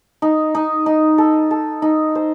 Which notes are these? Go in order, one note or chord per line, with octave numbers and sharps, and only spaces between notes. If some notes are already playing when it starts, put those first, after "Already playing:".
D#4
D#4
D#4
A4
A4
D#4
C5